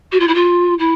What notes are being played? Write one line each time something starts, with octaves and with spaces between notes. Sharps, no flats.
F#4
F4
E4
F4
E4